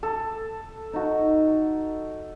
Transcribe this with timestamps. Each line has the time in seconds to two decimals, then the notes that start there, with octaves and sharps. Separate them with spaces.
0.03 A4
0.93 D#4 F#4